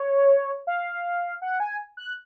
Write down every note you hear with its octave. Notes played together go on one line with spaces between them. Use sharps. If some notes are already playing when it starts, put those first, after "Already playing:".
Already playing: C#5
F5
F#5
G#5
F#6